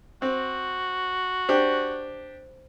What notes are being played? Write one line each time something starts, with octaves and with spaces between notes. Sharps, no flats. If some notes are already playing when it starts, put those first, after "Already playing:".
C4 F#4
D4 G4 C5